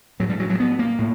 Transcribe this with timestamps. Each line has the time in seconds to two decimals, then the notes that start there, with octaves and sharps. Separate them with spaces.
0.20 A2 F#3
0.29 G3
0.40 F#3
0.50 F#3
0.60 B3
0.79 A#3
0.99 A2